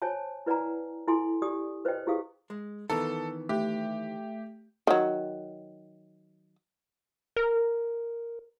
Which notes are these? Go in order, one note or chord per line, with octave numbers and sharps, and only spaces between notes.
C5 C#5 G#5 A5
E4 B4 D5 F#5 G#5 A#5
E4 A4 G#5 C6
G4 D5 G#5 D#6
B4 C5 D5 D#5 G5
E4 G4 G#4 C5 F5 D#6
G#3
D#3 E3 B3 A4
A3 G4
D#3 F#3
A#4